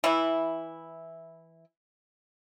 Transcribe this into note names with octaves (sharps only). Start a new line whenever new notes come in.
E3 E4